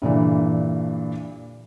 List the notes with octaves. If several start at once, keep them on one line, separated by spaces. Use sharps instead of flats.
G2 A#2 D3 E3